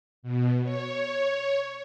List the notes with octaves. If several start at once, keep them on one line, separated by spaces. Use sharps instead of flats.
B2
C#5